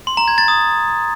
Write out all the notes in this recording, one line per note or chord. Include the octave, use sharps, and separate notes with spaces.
C6
A#5
G#6
A6
D#6